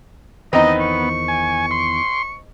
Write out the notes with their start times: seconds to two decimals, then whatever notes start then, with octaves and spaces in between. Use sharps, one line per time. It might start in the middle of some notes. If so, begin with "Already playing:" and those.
0.53 E2 D#3 B3 C4 D#4 D#5
0.80 C#6
1.28 G#5
1.71 C6